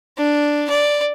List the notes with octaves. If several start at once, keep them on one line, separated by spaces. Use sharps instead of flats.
D4
D5